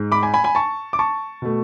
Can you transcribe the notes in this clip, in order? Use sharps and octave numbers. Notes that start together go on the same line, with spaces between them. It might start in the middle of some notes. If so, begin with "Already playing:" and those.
Already playing: G#2 G#3
B5 D6
G#5 B5
G#5 B5
G#5 B5
A5 C#6
D6
A5 C#6
B2 A3